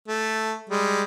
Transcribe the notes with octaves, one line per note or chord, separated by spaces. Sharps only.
A3
G3 G#3